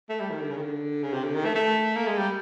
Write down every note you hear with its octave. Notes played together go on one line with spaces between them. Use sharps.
A3
G3
D#3
D3
C#3
D#3
D3
C#3
C3
D3
D#3
A3
A3
A#3
G#3
G3